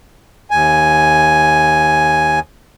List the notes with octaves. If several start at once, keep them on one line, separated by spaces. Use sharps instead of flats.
D#2 G#5